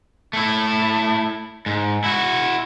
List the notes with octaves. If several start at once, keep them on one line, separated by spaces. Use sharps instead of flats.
A3 E4
G#2
E4 F#4